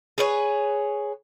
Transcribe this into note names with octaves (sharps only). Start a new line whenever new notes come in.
G#4 B4 C#5